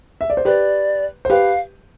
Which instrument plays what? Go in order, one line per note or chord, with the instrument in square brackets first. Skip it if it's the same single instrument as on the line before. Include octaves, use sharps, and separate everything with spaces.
[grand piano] E5
D5
C5
[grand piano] G4 B4 [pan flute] D5
[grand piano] C5
[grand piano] G4 B4 [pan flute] F5